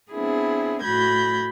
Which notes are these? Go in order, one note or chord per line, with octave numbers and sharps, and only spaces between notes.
B3 C4 D4 E4 G#4
A2 F#4 B5 G6 G#6 A#6